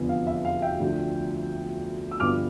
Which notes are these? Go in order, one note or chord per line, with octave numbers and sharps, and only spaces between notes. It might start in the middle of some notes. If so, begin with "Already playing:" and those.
Already playing: F1 E2 D3 F3 B3
F5
E5
F5
E5 G5
D2 D3 F3
E6
G1 G2 D3 F3 B3 D6 F6